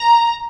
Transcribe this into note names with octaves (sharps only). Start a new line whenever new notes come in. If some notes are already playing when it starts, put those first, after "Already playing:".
Already playing: A#5